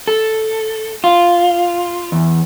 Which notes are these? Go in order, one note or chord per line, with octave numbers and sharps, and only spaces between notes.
A4
F4
E2